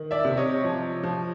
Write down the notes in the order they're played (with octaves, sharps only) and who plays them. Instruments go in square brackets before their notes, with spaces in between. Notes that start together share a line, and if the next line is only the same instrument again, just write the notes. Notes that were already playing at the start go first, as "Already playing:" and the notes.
Already playing: [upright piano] D#3
D5 E5
C3
C#5 D#5
F3
F3